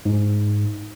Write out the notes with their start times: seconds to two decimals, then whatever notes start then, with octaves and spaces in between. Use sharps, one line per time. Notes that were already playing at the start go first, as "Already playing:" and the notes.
0.05 G#2